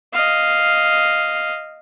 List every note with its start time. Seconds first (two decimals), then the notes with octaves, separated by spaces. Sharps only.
0.13 D#5 F5